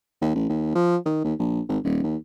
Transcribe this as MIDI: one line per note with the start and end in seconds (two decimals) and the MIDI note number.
0.21 0.31 39
0.35 0.45 33
0.49 0.75 39
0.75 0.97 53
1.06 1.22 51
1.24 1.34 39
1.39 1.61 34
1.69 1.78 32
1.84 2.03 27
2.04 2.16 39